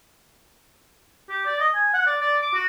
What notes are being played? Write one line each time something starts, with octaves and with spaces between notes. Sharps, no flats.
G4
D5
D#5
G#5
F#5
D5
D5
D6
F#4